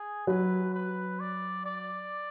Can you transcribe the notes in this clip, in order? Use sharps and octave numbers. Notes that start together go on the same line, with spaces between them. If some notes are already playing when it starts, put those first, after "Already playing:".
Already playing: G#4
F#3 B4
B4
D5
D5